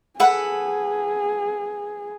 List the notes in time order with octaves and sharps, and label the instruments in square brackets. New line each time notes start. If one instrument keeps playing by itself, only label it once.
[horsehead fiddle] G#4 [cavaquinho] A4 B4 F#5